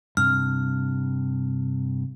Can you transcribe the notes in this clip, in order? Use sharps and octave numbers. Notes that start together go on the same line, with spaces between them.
G2 C3 F6